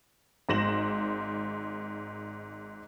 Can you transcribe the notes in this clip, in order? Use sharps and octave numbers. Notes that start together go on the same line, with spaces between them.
G#1 G#2 A#6 E7 F#7